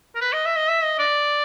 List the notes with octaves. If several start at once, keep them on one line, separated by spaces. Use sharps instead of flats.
A#4
B4
D#5
E5
D#5
E5
D#5
D5